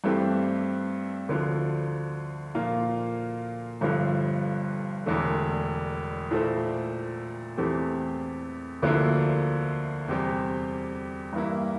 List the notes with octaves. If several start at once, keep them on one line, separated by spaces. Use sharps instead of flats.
G2 E3 A3 C4 G4
D2 D3 F3
A#2 F3 A#3 F4
G1 G2 D3 F3
E1 E2 D3 A3
A#2 A3 E4 A4 C5
E2 E3 A3 C4 G4
D2 D3 F3 A#3 E4
E2 C3 G3 C4 G4
G2 E3 A#3 E4